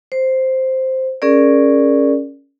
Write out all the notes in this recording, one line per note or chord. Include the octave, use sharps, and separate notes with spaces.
C5
C#4 G#4 A#4 D5